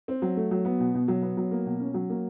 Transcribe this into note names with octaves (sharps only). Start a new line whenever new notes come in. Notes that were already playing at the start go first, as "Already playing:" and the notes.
C4
F#3
A3
F#3
B3
B2
B2
F#3
B3
F#3
A#3
B2
C#4
F#3
A#3